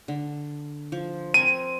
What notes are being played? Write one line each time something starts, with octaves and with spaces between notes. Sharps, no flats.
D3
F3
C4 A#4 G#5 D#7